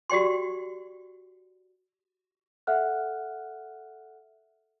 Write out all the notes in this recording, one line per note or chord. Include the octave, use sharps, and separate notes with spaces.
F#4 G4 D5 G5 C6
A4 E5 F#5 F6 F#6